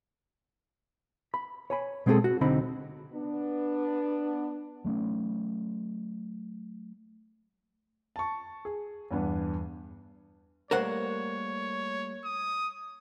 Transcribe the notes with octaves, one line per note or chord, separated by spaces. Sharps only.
B5
C#5 G#5 B5
B2 G#3 C4 D#4 G#4 A4
F#4
B1 D3 C4 D#4 B5
B3 D4
F#3 A3 A#3 C#4
A5 C#6
G#4
E2 G2 B3 D4
G3 A3 A#3 A#4 C5 C#5 F#5
D#6